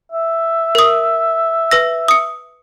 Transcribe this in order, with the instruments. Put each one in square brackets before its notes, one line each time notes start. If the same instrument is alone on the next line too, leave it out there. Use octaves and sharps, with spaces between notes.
[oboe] E5
[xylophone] A#4 D#6
B4 E6 A#6
D#6 C#7